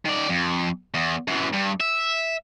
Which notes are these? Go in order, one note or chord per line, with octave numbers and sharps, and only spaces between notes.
D#3 D5
F2
E2
F#2 E3
G2
E5